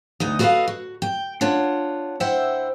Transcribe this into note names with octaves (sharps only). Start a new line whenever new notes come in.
D2 B3 D#4 D#5
F#4 A4 B4 D5 D#5 F5
F#4
G5
D4 F4 C#5 F#5
E4 C5 E5 F#5 G5